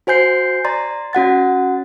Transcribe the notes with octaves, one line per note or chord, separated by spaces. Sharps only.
F#4 C5 G#5 G6 C7
D5 A#5 C6 A6
C#4 F#4 F#5 A6